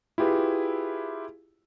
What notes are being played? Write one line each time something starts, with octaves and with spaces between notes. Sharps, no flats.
E4 F4 G4 G#4 B4